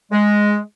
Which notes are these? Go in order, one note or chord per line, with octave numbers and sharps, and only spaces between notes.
G#3